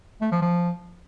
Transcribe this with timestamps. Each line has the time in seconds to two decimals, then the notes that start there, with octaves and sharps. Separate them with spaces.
0.21 A3
0.31 F3
0.42 F3